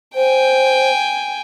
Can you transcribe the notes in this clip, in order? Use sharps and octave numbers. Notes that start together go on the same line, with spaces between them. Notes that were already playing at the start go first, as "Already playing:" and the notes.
C5 G5 G#5